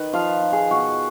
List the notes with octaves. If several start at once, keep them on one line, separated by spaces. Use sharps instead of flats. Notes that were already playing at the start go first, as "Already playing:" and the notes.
Already playing: D#3 D#4 B4
F3 F5
D#4
G#4
B2 F#4